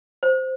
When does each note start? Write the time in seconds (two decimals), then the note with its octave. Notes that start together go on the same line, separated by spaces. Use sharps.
0.23 C5